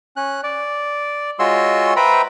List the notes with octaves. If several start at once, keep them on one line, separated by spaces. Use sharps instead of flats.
C#4 F#6
D5
G#3 F4 F#4 C#5 C6 E6
B4 C5 E5 G5 A#5 B5